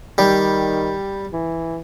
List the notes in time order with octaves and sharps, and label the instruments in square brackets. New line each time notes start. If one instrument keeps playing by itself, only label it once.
[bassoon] D#3 [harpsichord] G3
[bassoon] E3